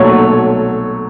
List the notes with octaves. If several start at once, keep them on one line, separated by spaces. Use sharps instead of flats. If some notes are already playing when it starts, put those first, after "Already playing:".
Already playing: B1 A#2 F#3 A3 C#5